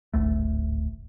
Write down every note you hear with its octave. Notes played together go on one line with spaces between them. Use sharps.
D1 G#1 D2 A3